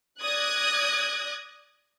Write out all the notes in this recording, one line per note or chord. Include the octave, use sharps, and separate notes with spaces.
D5 D#6 F#6 G#6 A#6